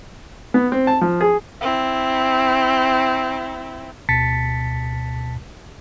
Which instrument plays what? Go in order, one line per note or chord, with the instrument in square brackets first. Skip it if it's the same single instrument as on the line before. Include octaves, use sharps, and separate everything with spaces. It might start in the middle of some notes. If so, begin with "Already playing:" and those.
[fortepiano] B3
C4
A5
F3
G#4
[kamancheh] C4 E4
[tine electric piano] D2 B2 A5 A6 B6 C#7